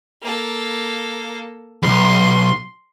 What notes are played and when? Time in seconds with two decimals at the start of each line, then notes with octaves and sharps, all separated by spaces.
0.22 A#3 A4
1.83 B1 E2 C6